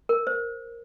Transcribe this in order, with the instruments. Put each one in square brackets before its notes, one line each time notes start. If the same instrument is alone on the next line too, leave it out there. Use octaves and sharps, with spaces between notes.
[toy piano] A#4
C5